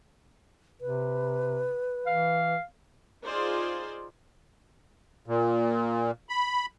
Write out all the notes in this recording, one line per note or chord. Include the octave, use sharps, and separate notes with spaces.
C3 B4
E3 F5
D#4 F4 G#4 C5 D5
A#2
B5